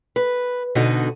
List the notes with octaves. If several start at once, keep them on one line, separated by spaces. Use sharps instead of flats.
B4
D2 B2 D3 D#4 F#4 D#5